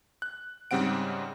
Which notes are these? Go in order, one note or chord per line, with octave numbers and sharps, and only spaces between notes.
F#6
G#2 C#3 G3 C4 F#5 D7